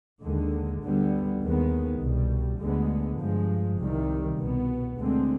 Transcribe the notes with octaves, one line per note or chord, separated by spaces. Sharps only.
D#2 D3 G#3
D2 D3 G3 B3
D#2 D#3 G#3 B3
C2 B2 G3
D2 D3 G#3 B3
G2 F3 G#3
C2 C3 D#3 G3
C2 B2 B3
D2 D3 G#3 C4